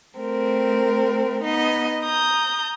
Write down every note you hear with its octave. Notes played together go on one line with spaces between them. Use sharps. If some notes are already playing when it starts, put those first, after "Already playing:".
A3 C4 A#4
B3 D#4 D#5
A#5 D#6 G6